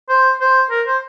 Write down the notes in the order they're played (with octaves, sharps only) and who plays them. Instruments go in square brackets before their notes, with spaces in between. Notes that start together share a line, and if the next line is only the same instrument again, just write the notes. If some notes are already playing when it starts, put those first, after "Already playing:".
[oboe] C5
C5
A#4
C5